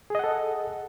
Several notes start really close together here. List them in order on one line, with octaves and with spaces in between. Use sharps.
G#4 D#5 F#5 A4